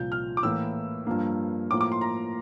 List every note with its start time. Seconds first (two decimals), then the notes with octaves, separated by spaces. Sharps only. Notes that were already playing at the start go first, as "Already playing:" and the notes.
Already playing: C2 A#2 F3 G6
0.12 F6
0.37 D6
0.43 A2 E3 A#3 E6
1.07 G2 F3 A#3
1.70 A2 F3 A#3 D6
1.81 D6
1.92 C6
2.01 A#5